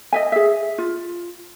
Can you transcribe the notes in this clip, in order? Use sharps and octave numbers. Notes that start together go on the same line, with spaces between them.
D#5 E5 G#5
G#4 E5
F4